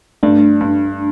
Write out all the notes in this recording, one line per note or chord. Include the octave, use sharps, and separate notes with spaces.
G2 A3 D4
G2